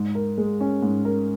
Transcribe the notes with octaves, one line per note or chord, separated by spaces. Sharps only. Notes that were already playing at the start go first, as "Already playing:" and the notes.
Already playing: G#2
A#4
G#3
C#4
G#2
A#4